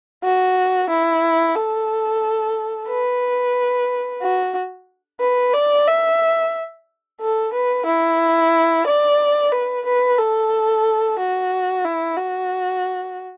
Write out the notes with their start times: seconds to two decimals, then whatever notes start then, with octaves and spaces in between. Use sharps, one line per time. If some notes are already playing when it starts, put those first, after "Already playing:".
0.24 F#4
0.89 E4
1.55 A4
2.89 B4
4.22 F#4
5.20 B4
5.54 D5
5.88 E5
7.21 A4
7.53 B4
7.86 E4
8.87 D5
9.52 B4
9.86 B4
10.19 A4
11.19 F#4
11.84 E4
12.17 F#4